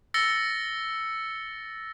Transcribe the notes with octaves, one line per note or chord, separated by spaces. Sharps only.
E6 A6 A#6 C#7 G7